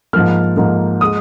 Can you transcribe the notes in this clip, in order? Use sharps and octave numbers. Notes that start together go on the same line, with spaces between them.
G#2 F3 A#3 F6
G#2 F3 A#3
G#3 D#6